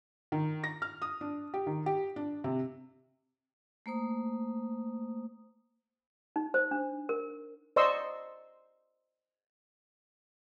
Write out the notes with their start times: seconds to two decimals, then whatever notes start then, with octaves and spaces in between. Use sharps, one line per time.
0.32 D#3
0.64 A#6
0.82 F6
1.02 D#6
1.21 D4
1.54 G4
1.67 D#3
1.86 G4
2.16 D4
2.44 C3
3.86 A3 A#3 C5 D#6
6.36 D#4
6.54 C5
6.71 D4
7.09 A#4
7.76 C5 D5 D#5 C6 C#6 E6